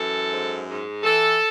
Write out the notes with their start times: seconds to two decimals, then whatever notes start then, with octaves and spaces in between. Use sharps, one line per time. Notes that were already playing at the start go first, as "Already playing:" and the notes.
Already playing: F#2 E3 A4
0.31 G#2
0.68 G#2
1.03 E3 A4